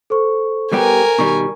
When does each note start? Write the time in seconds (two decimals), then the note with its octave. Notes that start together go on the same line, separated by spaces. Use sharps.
0.10 A4 C5 C#6
0.72 G3 B3 G4 A#4 G#5
1.19 B2 D#3 G3 C#6